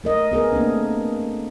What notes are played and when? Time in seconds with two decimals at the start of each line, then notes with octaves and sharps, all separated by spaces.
0.04 A3 A#4 D#5
0.32 B3 G#4 A#4
0.52 A3 A#3 C4 D4